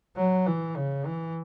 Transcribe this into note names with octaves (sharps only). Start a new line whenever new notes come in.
F#3
E3
C#3
E3